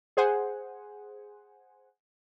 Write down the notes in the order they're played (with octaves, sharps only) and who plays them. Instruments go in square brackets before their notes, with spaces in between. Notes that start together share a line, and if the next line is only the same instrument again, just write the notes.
[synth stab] G#4 C5 F#5 G#5